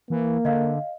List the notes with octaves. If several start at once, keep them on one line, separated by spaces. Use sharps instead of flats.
E3 A#3
D3 D#5 F5